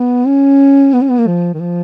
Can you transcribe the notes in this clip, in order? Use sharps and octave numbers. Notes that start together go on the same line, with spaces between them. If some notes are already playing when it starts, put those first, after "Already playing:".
Already playing: B3
C#4
B3
C#4
B3
A#3
F3
D#3
F3